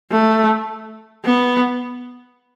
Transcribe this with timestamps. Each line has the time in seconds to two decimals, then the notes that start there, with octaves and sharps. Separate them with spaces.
0.12 A3
1.25 B3